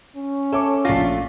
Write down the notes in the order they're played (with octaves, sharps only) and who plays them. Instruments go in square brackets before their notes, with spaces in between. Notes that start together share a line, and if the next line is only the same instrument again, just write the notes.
[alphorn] C#4
[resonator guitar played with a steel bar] A4 [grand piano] C#5 E5 D6
[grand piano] A#1 A#6 [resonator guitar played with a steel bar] A3 D4 F4